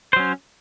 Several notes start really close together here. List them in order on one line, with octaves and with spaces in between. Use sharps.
C5 F#3 C#4